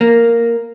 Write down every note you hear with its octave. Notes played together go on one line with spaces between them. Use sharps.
A#3